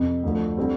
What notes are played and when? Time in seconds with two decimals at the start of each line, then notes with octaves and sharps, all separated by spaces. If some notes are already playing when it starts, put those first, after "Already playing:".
Already playing: F2 C3
0.23 D2 D3 F3 A3
0.57 D3 G3 C4